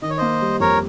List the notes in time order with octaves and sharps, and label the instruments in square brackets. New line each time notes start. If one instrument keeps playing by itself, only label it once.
[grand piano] D#3 [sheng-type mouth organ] D#5
[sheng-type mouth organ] C#5
[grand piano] A#3 [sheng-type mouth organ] C5 D#5
[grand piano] G3
[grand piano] F2 [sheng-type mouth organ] A#4 C#5